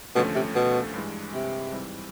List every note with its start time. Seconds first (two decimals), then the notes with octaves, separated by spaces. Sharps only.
0.15 D#2 B2 D3 F3 A3 C#4
0.35 C3
0.55 B2
0.94 G2 E3 G#3
1.33 C3
1.72 G#2 E3 G3 C4